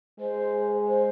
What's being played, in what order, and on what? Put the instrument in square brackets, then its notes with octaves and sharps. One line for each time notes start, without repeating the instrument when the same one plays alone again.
[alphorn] G#3 [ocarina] C5
[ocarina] C5